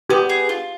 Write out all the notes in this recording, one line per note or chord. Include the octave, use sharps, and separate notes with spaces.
B3 G4
G#4
F4